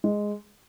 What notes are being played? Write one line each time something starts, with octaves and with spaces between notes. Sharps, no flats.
G#3